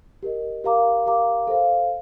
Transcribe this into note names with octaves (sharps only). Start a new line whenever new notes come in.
G4 A#4 D#5
G4 A#4 F5 A#5 D6
G4 A#4 F5 A#5 D6
A4 C5 F5